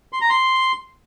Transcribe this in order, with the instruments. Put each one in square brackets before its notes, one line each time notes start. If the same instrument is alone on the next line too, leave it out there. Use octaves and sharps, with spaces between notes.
[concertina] C6
A#5
C6